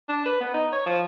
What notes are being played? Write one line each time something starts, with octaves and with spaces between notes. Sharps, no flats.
D4
B4
B3
D#4
C#5
F3